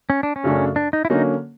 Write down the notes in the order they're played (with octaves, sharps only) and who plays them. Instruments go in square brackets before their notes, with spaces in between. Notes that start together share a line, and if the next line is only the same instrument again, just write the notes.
[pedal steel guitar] C#4
D4
C#4
[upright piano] F#2 C#3 F#3 A3 D4
[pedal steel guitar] D4
D#4
E4
[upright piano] D3 F#3 A#3 C#4 [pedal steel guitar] D#4